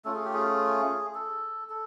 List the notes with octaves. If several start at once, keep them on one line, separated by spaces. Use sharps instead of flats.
A3 C#4 F4 A4
G#4
G4
G#4
A4
A4